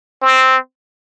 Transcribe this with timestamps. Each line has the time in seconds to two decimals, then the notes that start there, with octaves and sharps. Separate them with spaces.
0.22 C4